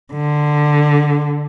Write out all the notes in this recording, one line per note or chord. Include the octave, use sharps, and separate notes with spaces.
D3